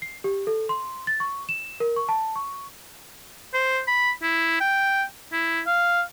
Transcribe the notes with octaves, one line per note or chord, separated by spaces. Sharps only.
C7
G4
A4
C6
A6
C#6
E7
A#4
C#6
A5
C#6
C5
B5
E4
G5
E4
F5